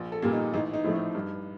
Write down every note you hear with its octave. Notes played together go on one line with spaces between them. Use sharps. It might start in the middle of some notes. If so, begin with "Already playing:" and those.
Already playing: A#1
A4
A#2 G3 A#3
D#4
A1 D#4
D#4
A2 F3 A3
D#4
G2